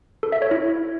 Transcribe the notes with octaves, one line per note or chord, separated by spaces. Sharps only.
A4
E5
C#5
E4